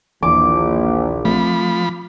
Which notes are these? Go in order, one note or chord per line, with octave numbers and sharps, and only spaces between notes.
A#1 D#2 E3 D6
F3 A3 C4 B5